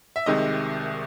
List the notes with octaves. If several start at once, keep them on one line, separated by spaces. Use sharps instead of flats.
E5
C2 C3 D#3 G#3 D#5